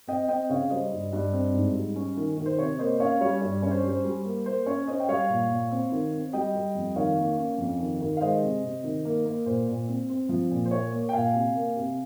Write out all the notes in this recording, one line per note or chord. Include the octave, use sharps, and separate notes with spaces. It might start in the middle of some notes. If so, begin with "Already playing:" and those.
C4 D#5 G5
C4 D#5 G5
C#3 C#5 F5
G3 C5 D#5
G2
G2
C4
G#2
G3
C#4
D#3
D#3
C5
C3 C#5
A#3 C5 D#5
C#4 C#5 F5
G3 C#5
G2 C#5
C#4 C#5
C5
G3
C5
G3
A#3
A#3 C5
C#4 C#5
C#4 C5 D#5
G5
G3 C#5 F5
A#2
A#2
C4
D#3
C4
G3 D#5 G5
G3
F2
D#3 C#5 F5
A#3
C#4
F2
D#3
D#3
F5
G#3 C5 D#5
C3
C3
D#3
A#3
A#3
A#2 C5
A#2
C4
C4
F3
A#2
C5
A#3 C#5
A#3
G5
A#2 F5 G#5
C3
A#3
C3